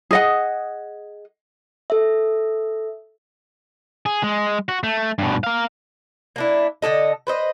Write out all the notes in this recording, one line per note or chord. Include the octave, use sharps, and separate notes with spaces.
G#4 D#5 F#5
A4 E5
G#4
G#3
F#4
A3
G2 B2
A#4 F5
A#3 D4 E4
D3 D#4 A4 D#5
B4 C5 D#5